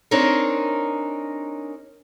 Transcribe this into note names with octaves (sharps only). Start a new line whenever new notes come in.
C4 D4 D#4 G#4 A#4 C#5